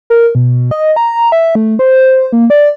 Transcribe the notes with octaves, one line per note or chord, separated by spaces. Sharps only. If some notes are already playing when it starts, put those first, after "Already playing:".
A#4
B2
D#5
A#5
E5
A3
C5
A#3
D5